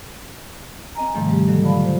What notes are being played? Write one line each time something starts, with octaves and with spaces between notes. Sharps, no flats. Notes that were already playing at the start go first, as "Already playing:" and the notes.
C4 D#5 G#5 A#5
G#2 C3 D#3 F3 G3 A3
G3 G4
D3 F#3 A4 D#5
F4 D5 F5 A5 B5
F4 C5